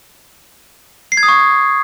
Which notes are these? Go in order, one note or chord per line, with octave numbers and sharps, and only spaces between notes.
C7
G#6
D#6
C#6